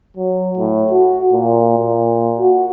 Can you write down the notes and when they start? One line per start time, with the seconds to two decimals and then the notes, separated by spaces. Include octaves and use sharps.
0.17 F#3
0.57 A2
0.91 F#4
1.33 A#2
1.79 A#2
2.39 F#4